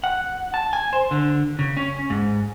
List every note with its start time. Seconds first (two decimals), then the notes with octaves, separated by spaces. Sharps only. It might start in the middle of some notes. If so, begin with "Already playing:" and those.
0.04 F#5
0.54 A5
0.73 G#5
0.93 C5
1.11 D3
1.59 C#3
1.77 C#4
2.10 G#2